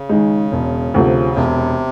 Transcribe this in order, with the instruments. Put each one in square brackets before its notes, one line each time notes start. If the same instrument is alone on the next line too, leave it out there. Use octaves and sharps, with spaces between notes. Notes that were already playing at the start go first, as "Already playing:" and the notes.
Already playing: [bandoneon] C#3
[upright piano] D#3 G#3
E1
D2 C3 F3
[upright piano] E1 [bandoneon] C3